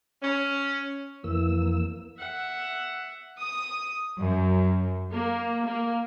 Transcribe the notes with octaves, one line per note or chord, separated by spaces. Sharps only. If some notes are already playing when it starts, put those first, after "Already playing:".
C#4
F2 E3 A#3 E6
E5 F#5
D#6
F#2
A#3
A#3